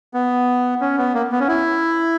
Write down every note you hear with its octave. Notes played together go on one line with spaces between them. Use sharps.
B3
C#4
B3
A#3
B3
C#4
E4